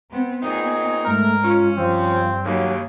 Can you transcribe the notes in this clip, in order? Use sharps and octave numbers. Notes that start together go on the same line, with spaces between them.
B3 C4
A#2 B3 C4 D#4 G#4
G#2 A3 A#4
C#4 F4
G2 F3 C4
D#2 C#3 F#3